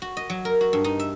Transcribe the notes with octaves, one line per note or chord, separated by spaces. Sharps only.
F#4
D#5
F#3
A#4
F#4
G2
D#4
E5